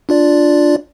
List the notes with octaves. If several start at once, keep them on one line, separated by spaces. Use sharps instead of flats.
D4 F4 D5